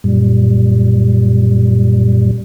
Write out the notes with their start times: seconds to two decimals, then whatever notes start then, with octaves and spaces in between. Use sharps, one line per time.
0.04 F#2 A#2 G3